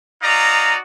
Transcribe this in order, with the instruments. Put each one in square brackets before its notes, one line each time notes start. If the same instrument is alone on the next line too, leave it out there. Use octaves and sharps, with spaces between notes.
[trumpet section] D#4 F#4 D5 D#5 F5 A#5